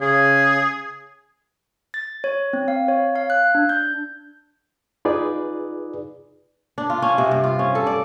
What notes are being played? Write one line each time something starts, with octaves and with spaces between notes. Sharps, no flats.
C#3 G#4
A6
C#5
C4
F5
C#5
F5
F#6
D4
G6
D#4 F4 G#4 B4 D5
D4
F4
C#4
C3
G2
F4
C#4
A4
D5